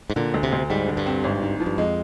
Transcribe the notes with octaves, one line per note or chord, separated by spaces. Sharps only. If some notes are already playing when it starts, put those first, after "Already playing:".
G#2
A#2 D3
D2
C3
D2
G#2 G3
D3
G2
C4
G#1
G#2
F3
G2
F2 G#3